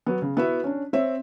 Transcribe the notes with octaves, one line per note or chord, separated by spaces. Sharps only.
F#3 B3
C#3
B3 E4 F#4 E5
C#4 D4
C4 C#5 E5